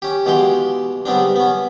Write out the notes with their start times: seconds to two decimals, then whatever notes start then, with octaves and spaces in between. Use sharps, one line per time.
0.02 C#4 G4
0.26 B2 E3 G#3 G4 F5 C6
1.06 C#3 G3 B3 C4 D4
1.36 B3 C#4